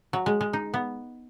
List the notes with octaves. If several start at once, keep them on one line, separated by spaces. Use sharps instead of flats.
F#3
G#3
G#3
D#4
B3